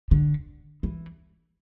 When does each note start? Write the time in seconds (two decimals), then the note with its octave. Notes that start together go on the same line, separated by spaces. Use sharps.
0.11 D3
0.83 E3